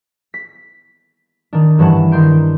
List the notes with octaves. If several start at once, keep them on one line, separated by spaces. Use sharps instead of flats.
B6
D#3 D4
G2 E3 C#4 F#5 A5
D#3 D4 C6 G6 D7